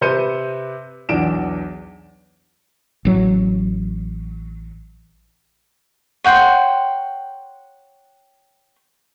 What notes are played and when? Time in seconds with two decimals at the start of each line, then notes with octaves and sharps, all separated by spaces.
0.01 C3 B4 C5 G6 C#7 D#7
1.09 B1 E2 D4 D7 E7
3.05 A1 F#3
6.24 C#5 F#5 G5 C6